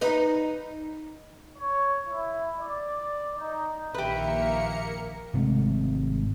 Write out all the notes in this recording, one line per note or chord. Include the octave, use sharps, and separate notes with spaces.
D#4 B4
C#5
E4
D5
D#4
A#1 D#3 A#3 G4 A#4 B4 E5 C#7
G#1 C3 G#3 A3